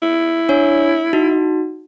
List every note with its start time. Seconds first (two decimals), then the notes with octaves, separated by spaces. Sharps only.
0.02 E4
0.49 D4 C#5
1.13 D#4 F#4